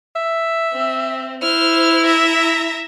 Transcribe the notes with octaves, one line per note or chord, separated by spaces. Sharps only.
E5
C4
E4 C5 F6
E5 A#5